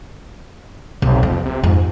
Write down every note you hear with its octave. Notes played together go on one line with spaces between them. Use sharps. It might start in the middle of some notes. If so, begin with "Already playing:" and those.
B1 C3
F2 B3
C3
F2 G#2